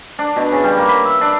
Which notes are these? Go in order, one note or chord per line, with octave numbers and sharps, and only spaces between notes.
D4
B2
C#3
G3
A#3
B5
E5
D4